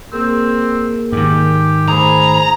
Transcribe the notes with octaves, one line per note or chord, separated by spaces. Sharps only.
A#3 C4 G#4 A#4
G#2 D#3 G4
A3 G#4 C5 A#5 B5